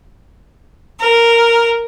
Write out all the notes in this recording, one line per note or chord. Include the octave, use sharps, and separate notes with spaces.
A#4